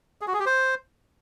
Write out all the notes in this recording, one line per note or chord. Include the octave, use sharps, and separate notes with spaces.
G#4
F#4
G#4
G4
C5